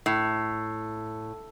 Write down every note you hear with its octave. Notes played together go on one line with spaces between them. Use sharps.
A2